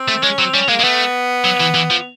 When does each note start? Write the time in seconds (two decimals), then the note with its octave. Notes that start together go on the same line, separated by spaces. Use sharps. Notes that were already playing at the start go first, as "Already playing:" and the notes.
Already playing: C4
0.08 A3
0.23 G#3 C#4
0.38 F#3 C4
0.54 G3 C#4
0.68 G#3 A#3
0.79 G#3
0.83 A3 B3
1.45 F#3
1.60 E3
1.75 E3
1.91 F3